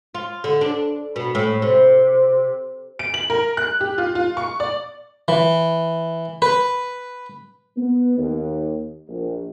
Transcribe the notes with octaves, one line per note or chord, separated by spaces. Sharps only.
F4
D3
D4
B2
A2
C3
D7
F#7
A#4
F#6
G4
F4
F4
C#6
D5
E3
B4
B3
D#2
A#1